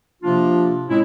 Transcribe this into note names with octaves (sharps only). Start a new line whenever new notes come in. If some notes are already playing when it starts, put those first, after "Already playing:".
C3 F3 A#3 D4 F4
A2 G#3 C4 C#4 E4